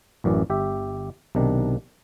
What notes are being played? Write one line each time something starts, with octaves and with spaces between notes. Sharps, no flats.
A1 F#2 E3 D5
G1 G4 E5
B1 C3 D#3 D4